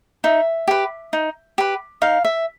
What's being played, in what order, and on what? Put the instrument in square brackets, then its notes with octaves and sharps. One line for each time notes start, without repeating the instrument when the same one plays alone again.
[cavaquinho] D#4 E5
G4 B4
D#4
G4 B4
D#4 F5
E5